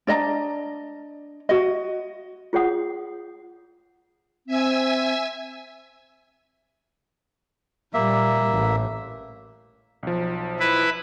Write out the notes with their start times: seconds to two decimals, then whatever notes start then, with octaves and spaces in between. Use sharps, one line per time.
0.07 D4 D5 D#5 A#5
1.49 F#4 D#5
2.53 F4 G#4 C#5 F#5 D#6
4.47 C4 E5 G#5 E6
7.94 A#2 G3 A#3 E5
8.50 A1
10.03 B1 F3
10.60 E4 B4